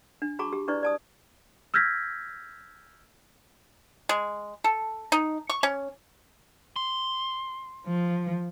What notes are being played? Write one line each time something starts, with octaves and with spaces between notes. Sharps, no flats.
D4
F#4 G#4 A5 A#5 C#6 D6
G4
D4 E4 B4 D5 C#6
D5 A5 D#6
E6 F6 G6 G#6 A#6 B6
G#3
A4
D#4
C#6
C#4
C6
F3